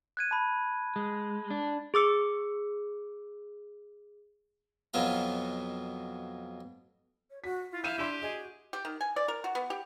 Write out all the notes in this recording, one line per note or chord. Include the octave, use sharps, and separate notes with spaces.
F#6 G#6 D#7
A5 B5
G#3
D4
G#4 D6 E6 C#7
F2 B2 F#3 B3 F4 A#5
C#5
F#4 B6
E4 F4
E5 F5 G6 D#7 E7
D4 G4 C6
F#4 G#4 D#5
G4
D#3
G#5
D5
A#4
F#4
B3
G4